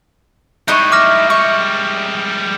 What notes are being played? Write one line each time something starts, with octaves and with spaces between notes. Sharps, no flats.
G3 G#3 D#4 E4 D#5 C#6 F#6
D6 F6 A#6
E5 C#6